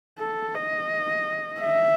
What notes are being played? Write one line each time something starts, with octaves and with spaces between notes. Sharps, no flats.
A4
D#5
E5